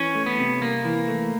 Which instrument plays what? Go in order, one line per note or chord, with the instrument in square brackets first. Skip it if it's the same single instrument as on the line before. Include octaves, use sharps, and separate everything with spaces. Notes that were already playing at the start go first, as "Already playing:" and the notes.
Already playing: [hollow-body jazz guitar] E3 [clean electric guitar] C#4
[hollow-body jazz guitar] A3
[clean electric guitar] B3
[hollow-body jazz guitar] C3
[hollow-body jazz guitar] C2 [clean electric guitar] A#3
[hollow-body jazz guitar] E3
A3